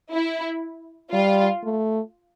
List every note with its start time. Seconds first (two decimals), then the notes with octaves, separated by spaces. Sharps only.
0.12 E4
1.12 G3 F4
1.64 A3